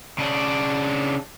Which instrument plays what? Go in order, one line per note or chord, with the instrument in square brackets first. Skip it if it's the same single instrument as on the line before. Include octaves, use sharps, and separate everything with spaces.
[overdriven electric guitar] C#3 D4